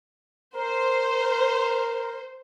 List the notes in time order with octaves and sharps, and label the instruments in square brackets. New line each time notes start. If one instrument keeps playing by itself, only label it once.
[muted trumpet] A#4 [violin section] C5